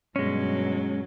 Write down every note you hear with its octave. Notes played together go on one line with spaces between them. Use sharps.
G2 B2 F#3 G#3 C#4